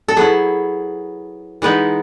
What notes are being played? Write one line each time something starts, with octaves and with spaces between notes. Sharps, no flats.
A4
F#3 B3 E4 G#4
E3 G#3 B3 D#4